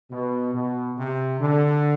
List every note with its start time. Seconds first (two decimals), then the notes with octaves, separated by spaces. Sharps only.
0.11 B2
0.53 B2
0.97 C3
1.39 D3